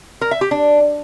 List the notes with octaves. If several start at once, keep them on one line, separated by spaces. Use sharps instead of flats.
A#4
E5
G4
D4